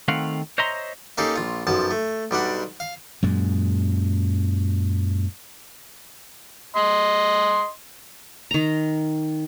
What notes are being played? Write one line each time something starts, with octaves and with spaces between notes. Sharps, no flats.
D#3 A3 C4 F5 F#5
C5 C#5 D#5 E5 A#5 C6
A#3 C#4 D#4 G4 A4 F5
A#1 F4
B1 F#2 F3 A5
A3
B1 G3 D4 F#5
F5
F#2 A#2 G#3
D#5 C6
D#3 A#5